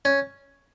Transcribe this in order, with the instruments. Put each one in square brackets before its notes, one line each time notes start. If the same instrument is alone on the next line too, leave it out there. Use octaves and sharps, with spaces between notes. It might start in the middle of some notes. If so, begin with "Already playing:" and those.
[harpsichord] C#4